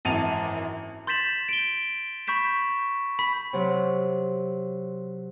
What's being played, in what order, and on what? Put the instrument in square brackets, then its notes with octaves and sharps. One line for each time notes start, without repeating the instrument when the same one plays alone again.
[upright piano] G#1 F#2 E3 A5 D#7 F7
[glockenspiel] C6 G6 A6 B6 E7 F#7
D7 G7
B5 C#6 G6 B6 E7
B5 B6
[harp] C3 F#3